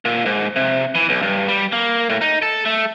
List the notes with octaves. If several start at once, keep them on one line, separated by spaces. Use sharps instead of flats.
A#2
G#2
C3
E3
B1
G2
G3
A#3
A2
D#4
A4
A3